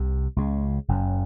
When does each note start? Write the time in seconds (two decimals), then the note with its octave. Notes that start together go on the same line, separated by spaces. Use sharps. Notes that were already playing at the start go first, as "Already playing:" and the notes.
Already playing: C2 C3
0.36 C#2 C#3
0.88 F#1 F#2 C#3